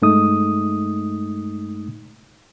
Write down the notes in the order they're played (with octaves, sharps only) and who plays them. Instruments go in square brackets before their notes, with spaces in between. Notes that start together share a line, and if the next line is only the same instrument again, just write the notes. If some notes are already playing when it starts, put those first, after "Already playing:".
[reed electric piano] G2 G#3 A3 D#4 D#6